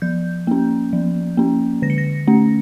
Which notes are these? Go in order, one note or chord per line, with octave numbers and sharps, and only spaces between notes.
F3 G6
A#3 C#4
F3
A#3 C#4
D3 A#6
C#7
A#6
A3 C#4